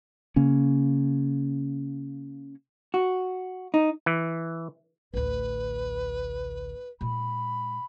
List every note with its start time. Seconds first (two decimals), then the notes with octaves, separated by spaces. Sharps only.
0.36 C#3 A#3 C#4
2.94 F#4
3.74 D#4
4.06 E3
5.14 A1 D2 B4
7.01 A#2 G#3 B5